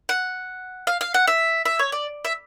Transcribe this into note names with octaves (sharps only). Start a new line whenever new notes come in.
F#5
F5
F5
F#5
E5
E5
C#5
D5
E5